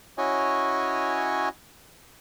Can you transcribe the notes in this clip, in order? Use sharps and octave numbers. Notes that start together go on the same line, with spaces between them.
C#4 E4 F#4 C#5 D#5 G#5